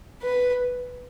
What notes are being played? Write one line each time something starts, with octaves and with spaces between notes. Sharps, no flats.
B4